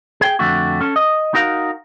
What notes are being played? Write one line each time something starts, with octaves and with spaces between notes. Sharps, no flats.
G#4 G5
F2 D3 A3 F#4
C#4 A4
D#5
D#4 F#4 A#4 F5